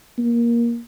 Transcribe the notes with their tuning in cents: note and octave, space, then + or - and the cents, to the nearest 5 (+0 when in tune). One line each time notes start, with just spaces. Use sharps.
A#3 +15